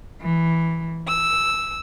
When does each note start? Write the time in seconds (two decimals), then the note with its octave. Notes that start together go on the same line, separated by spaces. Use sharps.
0.21 E3
1.08 E6